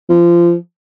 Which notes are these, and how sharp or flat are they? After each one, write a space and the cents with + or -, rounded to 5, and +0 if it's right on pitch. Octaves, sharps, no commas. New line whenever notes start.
F3 -25